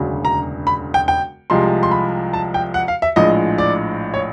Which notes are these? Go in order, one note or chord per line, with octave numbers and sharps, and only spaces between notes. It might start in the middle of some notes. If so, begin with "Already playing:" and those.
Already playing: E1 D2 C#3 F#3
A#5
B5
G5
G5
C2 C3 F3 G#3 C6
C6
B5
A5
G5
F#5
F5
E5
A#1 A2 F3 G#3 D#5
D5
C#5